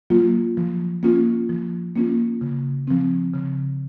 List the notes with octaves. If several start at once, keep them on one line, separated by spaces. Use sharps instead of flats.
F#3 A#3 F4
F3
A#3 C#4 F4
F3
A#3 C#4 F4
C#3
F3 C4
C#3